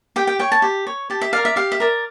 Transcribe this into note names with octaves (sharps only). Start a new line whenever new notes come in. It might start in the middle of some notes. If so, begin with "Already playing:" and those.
G4 G5
G5
C#5 G5
A5
G4
C#5
G4 A5
E5
A#4 D5 F5
E5
G4 F5
E5
A#4 D5